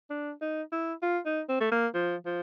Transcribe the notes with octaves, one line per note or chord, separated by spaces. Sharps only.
D4
D#4
E4
F4
D#4
C4
A3
A#3
F3
F3